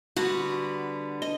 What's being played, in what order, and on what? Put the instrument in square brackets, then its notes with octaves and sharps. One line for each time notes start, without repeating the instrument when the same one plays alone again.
[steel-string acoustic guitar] D3 G3 B3 [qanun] F#4
[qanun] D#5